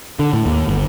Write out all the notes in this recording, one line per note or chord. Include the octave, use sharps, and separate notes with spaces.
D3
A2
D#2
G1